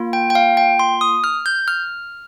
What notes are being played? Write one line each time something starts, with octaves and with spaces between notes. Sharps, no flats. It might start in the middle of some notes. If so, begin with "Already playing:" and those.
Already playing: A#3 F4
G5
G5
F5
G5
C6
D#6
F6
G6
F6